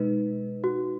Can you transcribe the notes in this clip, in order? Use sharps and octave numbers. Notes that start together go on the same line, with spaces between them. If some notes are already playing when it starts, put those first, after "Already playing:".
Already playing: B2 G#3 D#4 B4
F#4